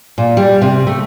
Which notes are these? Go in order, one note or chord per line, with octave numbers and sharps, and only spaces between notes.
A#2
G3
C3
A3